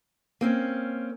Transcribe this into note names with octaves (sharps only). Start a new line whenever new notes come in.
A#3 C4 C#4